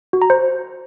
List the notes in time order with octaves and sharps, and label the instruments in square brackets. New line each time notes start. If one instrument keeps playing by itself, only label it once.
[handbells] F#4
A#5
C5